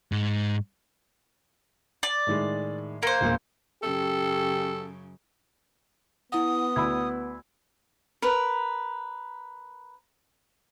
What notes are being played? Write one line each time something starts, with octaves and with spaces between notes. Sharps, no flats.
G#2
D5
A2 D#3 G#3
A#3 C5 C#7
E1 A#2
F#2 C#3 G4 A4
B3 E4 F#5 D#6
D2 E4 B5 E6 G#6
A#4 B4